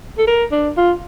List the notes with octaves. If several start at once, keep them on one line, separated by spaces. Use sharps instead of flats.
A4
A#4
D4
F4